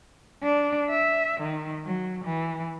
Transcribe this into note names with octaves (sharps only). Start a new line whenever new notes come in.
D4
E5
D#3
F#3
E3